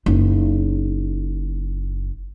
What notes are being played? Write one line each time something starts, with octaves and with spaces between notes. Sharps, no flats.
F#1 D#4